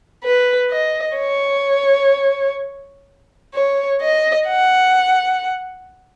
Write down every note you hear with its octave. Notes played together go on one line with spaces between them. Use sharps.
B4
D#5
C#5
C#5
D#5
F#5